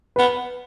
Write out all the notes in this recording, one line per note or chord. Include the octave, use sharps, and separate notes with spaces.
B3 B4